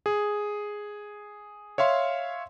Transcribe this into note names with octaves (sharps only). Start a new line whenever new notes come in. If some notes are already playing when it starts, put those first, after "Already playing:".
G#4
C#5 E5 F5 C6